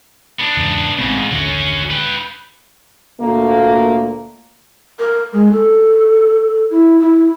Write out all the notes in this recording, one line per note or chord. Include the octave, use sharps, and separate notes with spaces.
B3 D4
E2 G#2 C#3
A1 G#2 C#3 C4
A1 D#2 D3 F#3 C#4
B4 G5
D2 A#2 A3 A#3
A#4
G#3
A4
E4
E4